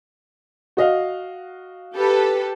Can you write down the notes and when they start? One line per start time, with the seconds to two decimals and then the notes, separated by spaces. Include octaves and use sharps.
0.77 F#4 D#5 F5
1.96 G4 A4 B4